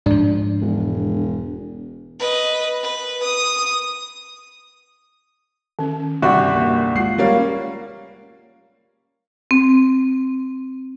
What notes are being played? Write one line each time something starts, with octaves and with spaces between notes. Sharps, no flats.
G#2 F3 D4
E1
B4 D#5
B4
D#6
D#3 C#4
G1 C2 F#4 G4 D5
A#3
G#3 F4 F#5 C7
G3 A#3 C#4 A#4 C#5
C4